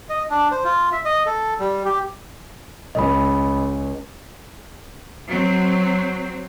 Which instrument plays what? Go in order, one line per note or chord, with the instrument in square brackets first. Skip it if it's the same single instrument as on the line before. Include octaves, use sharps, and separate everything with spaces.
[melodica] D#5
D4
C5
F4
E5
D#5
A4
G3
G4
[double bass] C#2 [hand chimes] D#5 B5
[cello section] F#3 C4